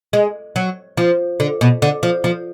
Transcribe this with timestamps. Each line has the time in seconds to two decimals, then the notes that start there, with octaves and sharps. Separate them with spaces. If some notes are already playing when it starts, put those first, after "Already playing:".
0.13 G#3
0.56 F#3
0.97 F3
1.40 D3
1.61 B2
1.82 D3
2.03 F3
2.24 F3